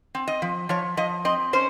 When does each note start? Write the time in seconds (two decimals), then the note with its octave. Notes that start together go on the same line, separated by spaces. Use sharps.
0.15 C4
0.28 D#5
0.42 F3
0.69 F3 C#5
0.97 F3 D#5
1.25 C4 D#5
1.53 C#4 C5